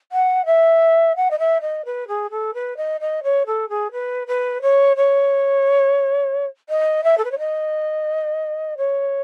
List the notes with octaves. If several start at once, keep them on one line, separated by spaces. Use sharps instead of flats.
F#5
E5
F#5
D#5
E5
D#5
B4
G#4
A4
B4
D#5
D#5
C#5
A4
G#4
B4
B4
C#5
C#5
D#5
E5
A4
B4
C#5
D#5
C#5